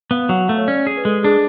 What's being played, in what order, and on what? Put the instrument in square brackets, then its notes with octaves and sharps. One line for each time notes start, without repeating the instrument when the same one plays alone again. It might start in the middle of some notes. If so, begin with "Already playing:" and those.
[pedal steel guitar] B3 [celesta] F5
[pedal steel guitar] F#3 [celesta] F#5
[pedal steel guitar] A3 [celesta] F5
[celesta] C#5
[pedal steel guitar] C#4 [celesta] D5
[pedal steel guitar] G#4
[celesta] B4
[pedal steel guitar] G#3 [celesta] A4
[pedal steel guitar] D4 [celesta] G#4